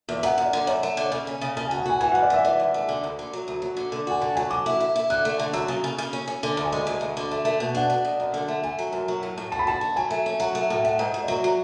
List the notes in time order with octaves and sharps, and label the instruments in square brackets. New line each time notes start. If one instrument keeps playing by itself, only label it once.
[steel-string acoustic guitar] E2
[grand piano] E5
[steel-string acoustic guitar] F#2 [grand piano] F#5
[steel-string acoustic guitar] F#2
[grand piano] D5
[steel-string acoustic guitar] D3
[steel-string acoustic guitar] F#2 [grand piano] C#5
[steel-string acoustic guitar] A3
D3
[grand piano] C#5
[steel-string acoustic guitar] C#3 [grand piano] D5
[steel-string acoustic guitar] C#4
C#3
[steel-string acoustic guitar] C#3 [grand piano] A5
[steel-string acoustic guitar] F#4 [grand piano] G#5
[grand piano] F#5
[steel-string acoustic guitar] F#4 [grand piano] G#5
[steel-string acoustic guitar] E3 [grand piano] G#5
[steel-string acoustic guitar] F#2 [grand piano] F#5
[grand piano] D5
[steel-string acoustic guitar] E3 [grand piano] E5
[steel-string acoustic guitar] E3 [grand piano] D5
[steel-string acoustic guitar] F#2
A3
D3
D2
D3
F#3
D2
F#3
D3
D3
[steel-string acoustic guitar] F#4 [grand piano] G#5
[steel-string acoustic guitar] D3 [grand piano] A5
[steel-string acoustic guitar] F#3 [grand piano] G#5
[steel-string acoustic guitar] D3 [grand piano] D6
[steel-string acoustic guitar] E4
E4
E4
[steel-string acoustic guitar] D3 [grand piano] F#6
[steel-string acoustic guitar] A3
D3
[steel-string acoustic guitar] F#3 [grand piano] E6
[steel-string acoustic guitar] C#3
C#3
C#3
C#4
C#4
D3
D2
[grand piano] G#5
[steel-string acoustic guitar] G#3
D2
D2
D3
A3
A3
B2
[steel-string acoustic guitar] D4 [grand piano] F#5
[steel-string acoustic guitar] D4
B2
F#2
D3
A3
[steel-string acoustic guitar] A3 [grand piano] G#5
[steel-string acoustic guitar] F#3
F#2
F#3
A2
A2
[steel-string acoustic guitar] F#4 [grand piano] A5
[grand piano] B5
[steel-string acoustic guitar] F#4 [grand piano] A5
[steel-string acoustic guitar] F#4
[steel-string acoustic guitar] F#3 [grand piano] G#5
[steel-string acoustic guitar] A3
C#4
[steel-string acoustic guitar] F#3 [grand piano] F#5
[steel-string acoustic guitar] A3
A2
[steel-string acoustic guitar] A3 [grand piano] F#5
[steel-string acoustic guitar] G#2
G#2
[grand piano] D5
[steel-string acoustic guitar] F#3 [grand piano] E5
[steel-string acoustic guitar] F#3